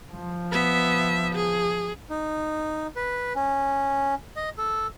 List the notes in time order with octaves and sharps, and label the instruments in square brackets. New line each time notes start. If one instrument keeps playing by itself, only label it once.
[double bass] F3
[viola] B3 E5
G#4
[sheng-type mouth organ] D#4
B4
C#4
D#5
A4